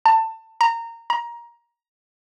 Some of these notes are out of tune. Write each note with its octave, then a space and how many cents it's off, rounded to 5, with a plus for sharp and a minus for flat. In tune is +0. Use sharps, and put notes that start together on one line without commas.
A5 +25
A#5 -15
A#5 +20